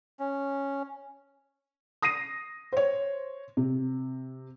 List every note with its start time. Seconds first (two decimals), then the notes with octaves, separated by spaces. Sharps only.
0.20 C#4
2.02 D#6 A#6 C7 D#7
2.73 C5 C#5
3.57 C3